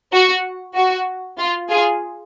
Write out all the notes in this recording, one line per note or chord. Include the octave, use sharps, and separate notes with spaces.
F#4
F#4
F4
F4 G#4